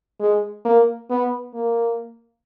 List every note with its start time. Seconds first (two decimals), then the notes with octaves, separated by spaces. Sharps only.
0.20 G#3
0.65 A#3
1.10 B3
1.54 A#3